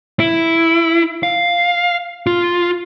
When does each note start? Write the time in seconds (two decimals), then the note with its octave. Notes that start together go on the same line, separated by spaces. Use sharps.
0.20 E4
1.23 F5
2.27 F4